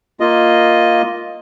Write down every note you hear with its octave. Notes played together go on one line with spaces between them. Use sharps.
A#3 F4 D#5